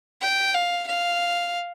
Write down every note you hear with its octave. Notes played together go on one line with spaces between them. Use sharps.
G5
F5
F5